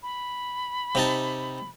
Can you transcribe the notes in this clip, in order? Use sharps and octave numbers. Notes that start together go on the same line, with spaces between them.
B5
C3 D#4 A5